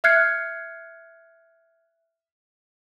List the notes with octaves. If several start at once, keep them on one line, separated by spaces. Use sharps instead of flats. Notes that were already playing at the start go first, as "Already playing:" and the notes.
E5 F6 F#6 G#6 C7 C#7